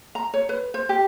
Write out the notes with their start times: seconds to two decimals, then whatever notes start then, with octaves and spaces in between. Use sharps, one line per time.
0.15 A#5
0.34 C#5
0.49 B4
0.74 C5
0.89 G4